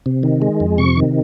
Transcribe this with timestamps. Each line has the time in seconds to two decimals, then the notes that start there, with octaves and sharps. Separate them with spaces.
0.06 C3
0.23 D#3
0.42 G#3
0.60 F2
0.78 C3 C#6
0.96 D#3